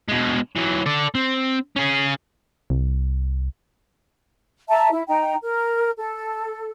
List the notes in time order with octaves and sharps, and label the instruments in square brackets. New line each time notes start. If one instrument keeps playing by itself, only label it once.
[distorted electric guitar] B2 G#3
E3 F#3
A4 D5
C4
C#4 G#4
[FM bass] C2
[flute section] E5 A5 A#5
E4
D#4 G5 A#5
A#4
A4